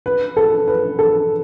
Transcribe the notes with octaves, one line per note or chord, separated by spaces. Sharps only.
B4
A4
B4
A4